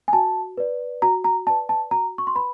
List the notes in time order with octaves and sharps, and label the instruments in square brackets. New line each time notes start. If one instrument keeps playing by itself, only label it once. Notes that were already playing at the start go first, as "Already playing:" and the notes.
[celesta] G#5
F#4 A5
B4 D5
F#4 A#5
A#5
D5 A5
B4
A5
F#4 A#5
C#6
C6
B4 B5